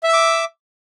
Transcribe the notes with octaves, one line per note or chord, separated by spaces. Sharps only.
E5 D6 E6